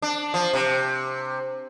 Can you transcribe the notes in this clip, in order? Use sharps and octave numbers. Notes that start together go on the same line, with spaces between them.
D4
F3
C3